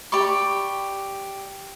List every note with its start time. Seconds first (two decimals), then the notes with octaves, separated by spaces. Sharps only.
0.12 G4 D5 B5 C#6